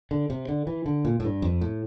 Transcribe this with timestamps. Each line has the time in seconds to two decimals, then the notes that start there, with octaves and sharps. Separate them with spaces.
0.11 D3
0.30 C3
0.48 D3
0.67 E3
0.86 D3
1.05 A#2
1.20 A2
1.24 G2
1.42 F2
1.61 A2